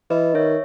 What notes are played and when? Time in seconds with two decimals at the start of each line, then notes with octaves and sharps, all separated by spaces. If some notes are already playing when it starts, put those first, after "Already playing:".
0.10 E3 B4 D#5
0.35 D#3 C#5 E5